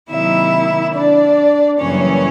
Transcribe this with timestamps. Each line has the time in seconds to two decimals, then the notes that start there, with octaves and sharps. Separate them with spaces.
0.10 C3 D#3 F#3 A#3 E4 E5
0.94 D4 D5
1.79 F#2 C#3 E3 G3 A#3 C#4 C#5